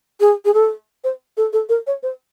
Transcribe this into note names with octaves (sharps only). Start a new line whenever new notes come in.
G#4
G#4
A4
C5
A4
A4
A#4
C#5
C5